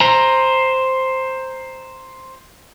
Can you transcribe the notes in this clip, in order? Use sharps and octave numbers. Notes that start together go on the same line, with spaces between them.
C5 A#5